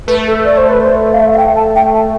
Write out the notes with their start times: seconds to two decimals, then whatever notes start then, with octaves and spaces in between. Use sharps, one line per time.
0.08 A3 B4
0.27 A4
0.45 D5
0.57 C5
0.69 B4
0.82 C5
1.13 F5
1.20 E5
1.33 F5
1.37 G5
1.56 A5
1.75 G5
1.94 A5